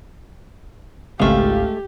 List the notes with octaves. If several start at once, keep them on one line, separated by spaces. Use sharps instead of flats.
G#1 C#2 G#3 A3 G4 F5